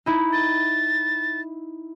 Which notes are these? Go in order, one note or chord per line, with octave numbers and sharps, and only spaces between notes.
D#4 E4
A6